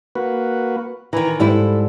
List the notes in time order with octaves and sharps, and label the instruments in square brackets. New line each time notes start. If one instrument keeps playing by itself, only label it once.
[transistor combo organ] A#3 F#4 B4
[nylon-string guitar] D#3 E3 [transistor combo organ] E4 A#5
[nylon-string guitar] G#2 G3 E4 [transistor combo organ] A4